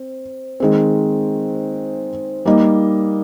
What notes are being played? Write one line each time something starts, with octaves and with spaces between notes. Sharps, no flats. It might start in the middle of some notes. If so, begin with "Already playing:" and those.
Already playing: C4
D#3 G#3 C4
G3 A#3 D#4